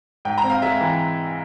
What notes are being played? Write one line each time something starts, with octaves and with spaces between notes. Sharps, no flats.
G#2 G5
A#5
C4
F5
G#3 E5
E3